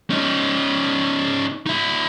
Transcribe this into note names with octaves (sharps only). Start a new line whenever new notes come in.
C#4 D#4
D#4 E5